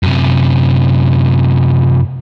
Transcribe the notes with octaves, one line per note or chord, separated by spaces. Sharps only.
F#2 C3